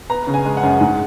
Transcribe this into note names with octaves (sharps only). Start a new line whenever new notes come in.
B3 A#5
C#3
G#5
G#3
F#5
F#2
G#2